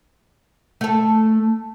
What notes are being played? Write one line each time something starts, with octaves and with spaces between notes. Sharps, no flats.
A3 A4